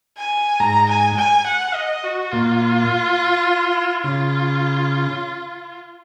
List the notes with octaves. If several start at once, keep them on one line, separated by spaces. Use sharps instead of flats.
G#5
G#2 A#5
G#5
G#5
F#5
D#5
F#4
A#2 F4
C#3 F4